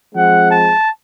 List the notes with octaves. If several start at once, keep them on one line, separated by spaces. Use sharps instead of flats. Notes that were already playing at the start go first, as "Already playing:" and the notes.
F3 G#3 C4 F#5
A5